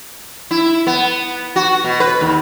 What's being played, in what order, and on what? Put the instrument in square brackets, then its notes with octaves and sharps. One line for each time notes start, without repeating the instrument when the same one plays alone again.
[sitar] E4
B3
F#4
B2
B4
D#2